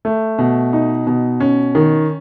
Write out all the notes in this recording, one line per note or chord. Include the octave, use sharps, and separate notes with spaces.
A3
B2
D#4
B2
C#4
D#3